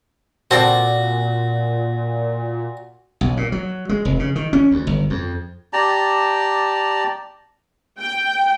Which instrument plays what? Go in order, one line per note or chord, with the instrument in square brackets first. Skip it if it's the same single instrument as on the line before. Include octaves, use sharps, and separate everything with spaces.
[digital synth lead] A#2 [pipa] C4 A4 D5 [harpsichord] F#4
[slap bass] B1
A#2
F#3
G#3
F1
C#3
D#3
C#4
D2
G1
F2
[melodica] G4 D5 A5 A#5
[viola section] G5